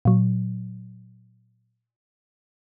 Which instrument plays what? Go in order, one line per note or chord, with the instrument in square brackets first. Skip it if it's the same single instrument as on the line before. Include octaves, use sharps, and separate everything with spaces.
[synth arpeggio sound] A#2 F#3